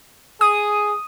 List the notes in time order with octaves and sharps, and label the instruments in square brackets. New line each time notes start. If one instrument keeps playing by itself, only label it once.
[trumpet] G#4 [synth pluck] D#6